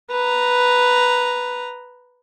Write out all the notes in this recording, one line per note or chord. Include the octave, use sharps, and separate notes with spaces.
B4 A#5